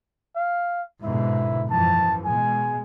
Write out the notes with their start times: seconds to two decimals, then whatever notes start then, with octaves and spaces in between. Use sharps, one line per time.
0.36 F5
1.03 G#2 B2 D3 E4
1.71 F#2 E3 F3 A5
2.25 B2 G#3 G#5